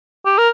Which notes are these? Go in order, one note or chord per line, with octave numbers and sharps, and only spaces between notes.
G4
A#4